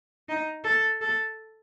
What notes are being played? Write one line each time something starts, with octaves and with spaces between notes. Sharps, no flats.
D#4
A4
A4